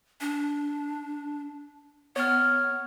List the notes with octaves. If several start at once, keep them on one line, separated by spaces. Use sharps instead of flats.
D4
B3 C#5 F6